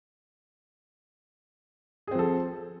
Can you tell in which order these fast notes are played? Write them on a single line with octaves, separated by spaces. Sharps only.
G#4 C4 F3 A4